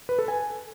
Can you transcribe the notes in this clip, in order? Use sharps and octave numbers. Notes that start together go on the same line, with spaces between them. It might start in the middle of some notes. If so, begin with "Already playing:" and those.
B4
A4
G#5